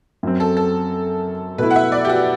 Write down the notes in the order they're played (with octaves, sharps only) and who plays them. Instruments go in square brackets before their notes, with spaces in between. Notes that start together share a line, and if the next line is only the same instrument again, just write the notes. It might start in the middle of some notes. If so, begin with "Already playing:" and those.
[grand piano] F#2 F#3 C4
[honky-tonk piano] A4
A4
[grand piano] B2 A3 E4 [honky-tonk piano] B4
[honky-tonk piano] F#5
E5
D5
G4
F#4